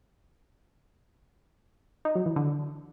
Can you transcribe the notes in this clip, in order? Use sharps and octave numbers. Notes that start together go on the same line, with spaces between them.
D#4
F#3
E3
D3